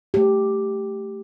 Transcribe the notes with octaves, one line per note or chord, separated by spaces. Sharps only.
A3 G4